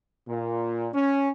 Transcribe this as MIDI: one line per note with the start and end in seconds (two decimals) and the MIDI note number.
0.28 0.88 46
0.94 1.30 61